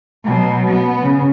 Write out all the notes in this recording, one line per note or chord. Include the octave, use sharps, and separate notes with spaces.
B2 F#3
B3
C#3